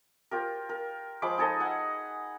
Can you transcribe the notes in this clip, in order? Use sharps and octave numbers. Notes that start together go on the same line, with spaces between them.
F4 G4 A#4
A#4
F3 G#3 B5 D6
D#4 G#4 A4 D#5
F#5 G#5